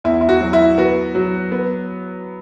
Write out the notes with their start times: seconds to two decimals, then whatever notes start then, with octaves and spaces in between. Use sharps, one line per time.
0.04 E2 E4
0.21 E4
0.29 F#4
0.41 F#3
0.53 E4
0.78 B3 F#4
1.15 F#3
1.52 B3